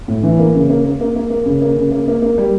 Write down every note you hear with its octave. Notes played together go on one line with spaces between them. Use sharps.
A2
E3
A#3
C#3
A#3
A#3
A#3
A#3
A#3
C#3
A#3
C#3
A#3
A#3
A#3
G3